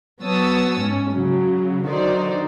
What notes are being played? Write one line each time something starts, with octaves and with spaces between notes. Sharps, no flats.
F#3 B3 C#5 A5 D#6 E6
G#2 C#4
C#3 F#3
D3 D#3 F#3 D#4 C5 D5